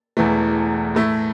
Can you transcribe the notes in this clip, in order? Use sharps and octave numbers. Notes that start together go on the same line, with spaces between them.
E1 E2 E3 A3
A2 A3 E4